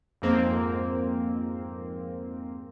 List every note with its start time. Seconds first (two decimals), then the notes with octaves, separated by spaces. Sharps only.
0.22 F2 G#2 A#3 C4